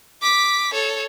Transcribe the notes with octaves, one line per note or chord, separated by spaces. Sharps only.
D6 B6
A4 C#5